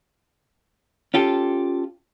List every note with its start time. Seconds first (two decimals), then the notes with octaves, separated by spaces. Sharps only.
1.14 C#4 F4 G4 A4